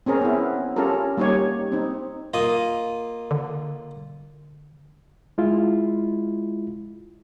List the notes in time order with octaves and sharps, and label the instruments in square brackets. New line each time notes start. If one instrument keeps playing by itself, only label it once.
[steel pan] C4 C#4 G#4 A#4
B3 E4
C#4 F4 G4 A4 A#4
G3 A#3 D#4 G4 C#5
C4 D#4
[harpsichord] A#3 F4 D#5
[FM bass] D3
[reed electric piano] G#3 E4 F4